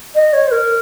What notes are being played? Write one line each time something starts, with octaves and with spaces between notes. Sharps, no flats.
D#5
C#5
C5
A#4